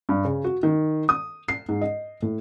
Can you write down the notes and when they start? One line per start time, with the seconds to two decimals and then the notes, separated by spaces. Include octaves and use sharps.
0.09 G2
0.25 C#3
0.44 F#4
0.63 D#3
1.09 D#6
1.48 C7
1.69 G#2
1.81 D#5
2.22 A2